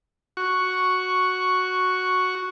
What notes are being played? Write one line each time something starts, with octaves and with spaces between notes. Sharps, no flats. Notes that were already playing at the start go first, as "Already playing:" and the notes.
F#4 C#6